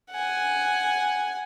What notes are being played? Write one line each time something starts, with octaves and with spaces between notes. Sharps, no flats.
F#5 G#5